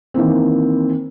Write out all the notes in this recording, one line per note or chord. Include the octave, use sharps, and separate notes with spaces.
D#3 E3 A#3 C4